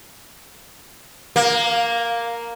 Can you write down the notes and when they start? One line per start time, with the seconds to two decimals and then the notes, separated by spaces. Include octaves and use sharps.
1.36 A#3